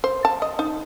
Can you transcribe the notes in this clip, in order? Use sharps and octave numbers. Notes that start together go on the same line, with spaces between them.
C5
A5
D#5
D#4